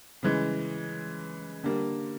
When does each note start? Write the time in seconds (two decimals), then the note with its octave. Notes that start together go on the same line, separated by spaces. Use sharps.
0.23 C#3 E3 G#3
1.63 D3 G3 A#3